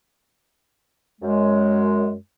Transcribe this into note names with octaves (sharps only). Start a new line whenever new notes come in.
F#2 G#3